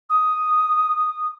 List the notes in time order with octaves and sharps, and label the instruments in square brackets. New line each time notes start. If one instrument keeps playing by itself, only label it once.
[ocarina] D#6